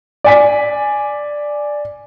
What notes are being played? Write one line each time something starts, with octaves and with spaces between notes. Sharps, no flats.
D5 G#5 B6